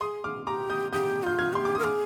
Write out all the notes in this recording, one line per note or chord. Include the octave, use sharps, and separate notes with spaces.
G#4 C6 D#6
D6 F6
G4 A#5 D6
D#6 G6
G4 D#6 G6
F4 G6
F6 G#6
G4 C6
D6
A#4 D#6
G#4 D6 F6